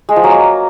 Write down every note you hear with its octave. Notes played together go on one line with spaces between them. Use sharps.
G#3
F3
F#3
A#3